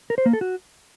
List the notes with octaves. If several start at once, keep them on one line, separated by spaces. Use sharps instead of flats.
A#4
C5
A#3
A4
F#4